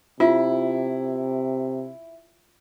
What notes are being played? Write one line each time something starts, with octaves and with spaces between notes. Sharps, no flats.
C3 E4 F4